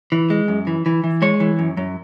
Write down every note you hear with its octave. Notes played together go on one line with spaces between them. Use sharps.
E3
G#3
F#2
E3
E3
E3
G#3 C#5
E3
F#2
F#2